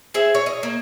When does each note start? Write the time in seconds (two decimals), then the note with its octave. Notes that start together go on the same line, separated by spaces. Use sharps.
0.14 G#4 C5 E5
0.35 C#5
0.46 D#5
0.63 A#3